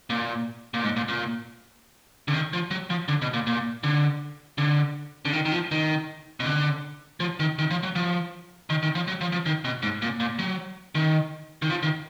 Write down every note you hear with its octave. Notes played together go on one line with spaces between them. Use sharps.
A#2
A#2
G#2
A#2
A#2
D3
D#3
F3
F#3
F3
D3
B2
A#2
A#2
D3
D3
D3
D#3
D#3
F3
D#3
B2
D3
F3
D#3
D#3
F3
F#3
F3
D#3
D#3
F3
F#3
F3
F3
D#3
B2
G#2
A#2
A#2
F#3
D#3
D#3
F3
D#3